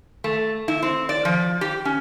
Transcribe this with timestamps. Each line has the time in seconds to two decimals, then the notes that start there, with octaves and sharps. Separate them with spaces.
0.24 A3
0.68 E4
0.83 C4
1.09 D5
1.25 F3
1.61 G4
1.85 C#4